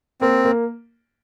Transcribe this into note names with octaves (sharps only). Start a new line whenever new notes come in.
A#3 C4
A#3